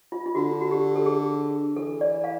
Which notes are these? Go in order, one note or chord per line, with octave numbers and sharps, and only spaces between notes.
F4
F4
D3 F#4
F#4
G4
A4
G#4
E3 A4
D5
F5